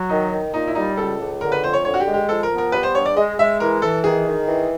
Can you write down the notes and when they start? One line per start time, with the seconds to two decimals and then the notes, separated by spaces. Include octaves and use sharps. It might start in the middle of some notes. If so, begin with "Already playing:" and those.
Already playing: F#3
0.09 D#3 D#4
0.31 D#3
0.54 A#2 D#4
0.67 E4
0.75 G3 D#4
0.97 C#2 A4
1.19 C#2
1.41 D3 A#4
1.52 B4
1.64 F2 C5
1.73 C#5
1.85 D3 C#5
1.94 F#4
2.00 G4
2.07 G#3
2.14 G4
2.29 F3 A4
2.43 A#4
2.51 B3
2.58 A#4
2.72 G3 B4
2.83 C5
2.94 G2 C#5
3.05 D5
3.16 G#3 D#5
3.39 G#3 E5
3.60 E3 A#4
3.82 E3 A4
4.04 D#3 G#4
4.27 D#3
4.48 E3